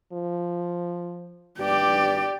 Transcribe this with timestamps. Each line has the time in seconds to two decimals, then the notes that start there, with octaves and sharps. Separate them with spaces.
0.13 F3
1.60 G2 G4 D5